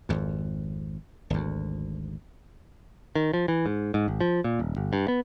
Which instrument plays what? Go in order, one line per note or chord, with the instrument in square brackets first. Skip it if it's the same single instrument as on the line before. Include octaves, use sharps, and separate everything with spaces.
[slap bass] G#1 F2
G#1 D2
[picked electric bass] D#3
F3
E3
G#2
G#2
G#1
F3
A#2
D#1
G1
G2
B3